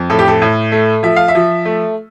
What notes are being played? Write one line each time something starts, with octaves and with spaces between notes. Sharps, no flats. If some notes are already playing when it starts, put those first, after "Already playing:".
Already playing: F2
A2 A4
G4
A4
A2
A3
F3 E5
F5
E5
F3
A3